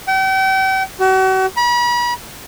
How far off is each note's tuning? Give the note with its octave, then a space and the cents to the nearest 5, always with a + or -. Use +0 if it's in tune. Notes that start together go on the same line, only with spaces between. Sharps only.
G5 -40
F#4 +40
B5 -40